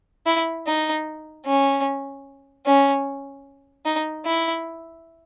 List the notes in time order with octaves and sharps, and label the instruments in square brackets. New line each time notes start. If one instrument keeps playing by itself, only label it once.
[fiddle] E4
D#4
C#4
C#4
D#4
E4